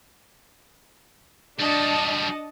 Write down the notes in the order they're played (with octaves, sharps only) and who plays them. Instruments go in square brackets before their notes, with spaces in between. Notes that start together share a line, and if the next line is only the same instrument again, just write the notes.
[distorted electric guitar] G3 F#4 [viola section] D4 D#5 A5